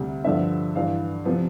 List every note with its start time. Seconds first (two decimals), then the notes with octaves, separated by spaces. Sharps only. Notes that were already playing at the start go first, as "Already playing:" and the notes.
Already playing: D2 C3 G3
0.24 G2 D3 F3 E5
0.75 G2 E3 G3 F5
1.25 C3 F3 B3